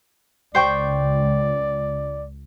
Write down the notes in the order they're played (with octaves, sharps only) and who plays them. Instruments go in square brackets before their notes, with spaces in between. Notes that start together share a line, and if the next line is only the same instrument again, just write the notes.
[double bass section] C#2 [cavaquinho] C5 G5 C#6 [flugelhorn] D5